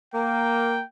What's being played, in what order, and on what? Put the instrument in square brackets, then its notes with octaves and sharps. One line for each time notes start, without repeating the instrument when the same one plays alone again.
[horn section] A#3 [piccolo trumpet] G5